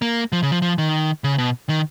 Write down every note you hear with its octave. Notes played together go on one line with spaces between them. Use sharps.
A#3
F3
C#3
F3
F3
D#3
C#3
B2
D#3